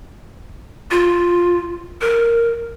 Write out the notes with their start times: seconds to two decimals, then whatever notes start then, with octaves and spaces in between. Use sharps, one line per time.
0.91 F4
2.01 A#4